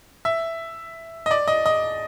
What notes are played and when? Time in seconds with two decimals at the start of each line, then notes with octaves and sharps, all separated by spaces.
0.25 E5
1.26 D#5
1.31 D5
1.48 D#5
1.66 D#5